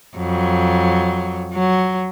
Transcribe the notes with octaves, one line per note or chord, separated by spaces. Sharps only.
F2 F#3
F#3